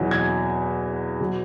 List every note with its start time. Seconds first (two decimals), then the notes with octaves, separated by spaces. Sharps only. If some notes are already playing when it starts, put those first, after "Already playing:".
Already playing: E2 B2 F#3
0.11 G#6
1.20 B2 F#3